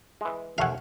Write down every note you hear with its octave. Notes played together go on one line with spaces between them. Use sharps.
E3 G#3
D#2 A3 F5 F#5 G#5